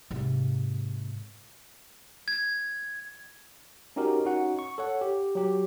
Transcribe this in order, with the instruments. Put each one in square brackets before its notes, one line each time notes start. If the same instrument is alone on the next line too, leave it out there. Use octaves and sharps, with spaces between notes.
[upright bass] G#2 C3
[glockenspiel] G#6
[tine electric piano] C#4 D#4 F#4 G4 A#4
C#4 D#4 F#4 F#5
C#6
A4 C#5 F#5
G4
F#3 G4